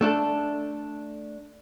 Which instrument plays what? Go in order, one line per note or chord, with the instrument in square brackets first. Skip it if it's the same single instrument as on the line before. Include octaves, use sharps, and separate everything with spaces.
[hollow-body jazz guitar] A3 D4 A4